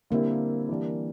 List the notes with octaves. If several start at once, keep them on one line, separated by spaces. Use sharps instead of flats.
D3 G3 A#3 C4 E4
E3 G3 D4